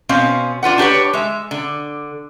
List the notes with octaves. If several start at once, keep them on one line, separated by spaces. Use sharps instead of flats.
B2 C4 C#4 F5
D4 F4 B4 F#5
D4 G4 B4 C#5
G#3 E5
D3